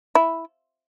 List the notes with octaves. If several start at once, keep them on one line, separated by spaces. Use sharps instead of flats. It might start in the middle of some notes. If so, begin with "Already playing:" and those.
E4